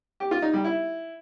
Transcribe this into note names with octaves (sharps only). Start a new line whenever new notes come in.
G4
F4
D#4
G3
E4